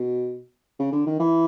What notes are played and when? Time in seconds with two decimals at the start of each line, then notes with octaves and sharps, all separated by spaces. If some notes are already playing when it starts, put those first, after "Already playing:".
Already playing: B2
0.79 C#3
0.92 D3
1.06 D#3
1.19 E3